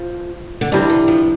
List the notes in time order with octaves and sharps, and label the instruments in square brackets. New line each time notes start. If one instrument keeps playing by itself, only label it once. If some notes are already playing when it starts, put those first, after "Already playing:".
Already playing: [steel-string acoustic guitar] F3
D3
[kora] C3 G3 D4 [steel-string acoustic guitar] E3
[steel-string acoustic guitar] E3
F3